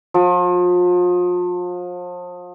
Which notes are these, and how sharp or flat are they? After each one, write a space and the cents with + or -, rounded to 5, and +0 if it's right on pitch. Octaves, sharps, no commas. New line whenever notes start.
F3 +35